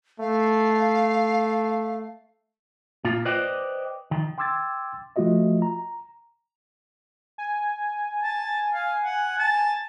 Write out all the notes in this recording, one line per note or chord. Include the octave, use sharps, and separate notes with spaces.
A3 F5
A#2 F4
B4 C5 D5 D#5 G5
D#3
G5 C6 D6 E6 G#6 A6
F3 A3 F4 F#4 D#5 E5
A#5
G#5
A5
F5
F#5
A5